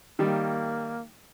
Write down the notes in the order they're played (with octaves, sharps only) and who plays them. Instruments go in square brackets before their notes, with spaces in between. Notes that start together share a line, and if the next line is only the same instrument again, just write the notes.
[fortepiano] D#3 G3 [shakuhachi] A#3